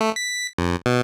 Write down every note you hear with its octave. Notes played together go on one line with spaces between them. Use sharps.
A3
B6
F2
B2